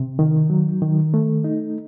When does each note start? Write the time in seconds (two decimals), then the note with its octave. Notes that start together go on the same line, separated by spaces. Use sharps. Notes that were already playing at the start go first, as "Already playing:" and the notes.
Already playing: C3
0.19 D#3
0.50 F#3
0.82 D#3
1.14 A3
1.44 D#4